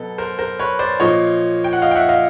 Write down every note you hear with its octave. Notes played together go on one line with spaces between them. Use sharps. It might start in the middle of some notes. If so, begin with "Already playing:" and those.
Already playing: B2 F#3 B3 A4
A#4 C5
A#4 C5
B4 C#5
C5 D5
A#2 F3 A#3 C#5 D#5
G5
F#5
D#5 F5
G5
E5 F#5
D#5 F5